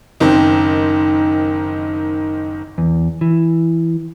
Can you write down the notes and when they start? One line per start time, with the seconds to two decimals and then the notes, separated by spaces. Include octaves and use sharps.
0.20 F#1 D#3 C4
2.78 E2
3.21 E3